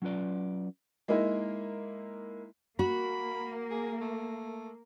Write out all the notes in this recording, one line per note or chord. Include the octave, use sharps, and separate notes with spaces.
F#3 C#4 F4 B4 D5
G#3 A#3 D#4 E4
A#3 F#4 B5
G#4
A3